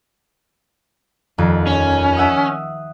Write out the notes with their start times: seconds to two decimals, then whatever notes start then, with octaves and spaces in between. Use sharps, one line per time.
1.38 D#1 F2
1.67 C#4
2.17 E5 F#5 D#6